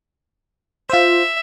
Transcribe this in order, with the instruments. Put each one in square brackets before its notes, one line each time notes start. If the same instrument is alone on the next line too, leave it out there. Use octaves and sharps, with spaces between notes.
[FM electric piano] F4 C5 [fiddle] E5